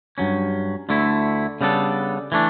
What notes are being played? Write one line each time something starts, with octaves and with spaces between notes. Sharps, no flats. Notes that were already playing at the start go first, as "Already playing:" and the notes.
G2 F#3 C#4
D2 D3 A3 E4
C#3 G3 B3 D4 A4
E3 A3 D4